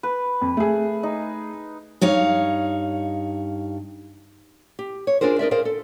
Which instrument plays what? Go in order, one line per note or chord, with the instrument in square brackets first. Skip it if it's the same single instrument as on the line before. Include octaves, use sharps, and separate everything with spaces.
[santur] B4
[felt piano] F2
A3 G#4
[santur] D#4
[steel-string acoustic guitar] G2 D#4 C#5 F5
[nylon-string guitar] G4
C#5
D4 F4 G#4 A#4 C5
D#4 A#4 D5 E5
G#4 A#4 C5 D5 F5
A4